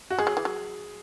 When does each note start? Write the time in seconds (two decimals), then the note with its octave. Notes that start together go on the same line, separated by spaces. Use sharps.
0.11 F#4
0.19 G#3 G#4
0.27 F#3
0.37 E3
0.45 F#3